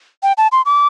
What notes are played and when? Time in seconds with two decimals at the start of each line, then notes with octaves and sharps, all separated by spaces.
0.23 G5
0.38 A5
0.52 C6
0.66 D6